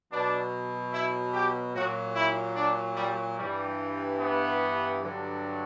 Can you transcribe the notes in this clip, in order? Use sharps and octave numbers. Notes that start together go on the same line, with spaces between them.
B2 F#3 D4
E4
G4
A#2 F#3 F#4
E4
D4
G3
G2 E3 G3
B3
G2 D3 F#3